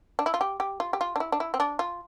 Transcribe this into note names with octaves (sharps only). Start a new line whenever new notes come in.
D4
E4
F4
G4
G4
F4
G4
F4
D4
E4
D4
E4
C4
D4
F4